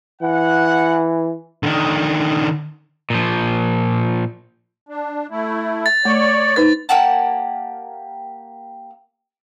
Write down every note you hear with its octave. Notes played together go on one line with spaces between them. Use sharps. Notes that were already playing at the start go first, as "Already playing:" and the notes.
E3 F#5
D3 D#3
A#2 F3
D4
A3 E4
A6
A3 C#5 D5
D#4 B4 C5 A6
A#3 G4 F#5 A5